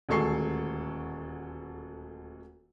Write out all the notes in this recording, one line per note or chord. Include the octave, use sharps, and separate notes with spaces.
D#1 D2 G#3 A4 C#6 C7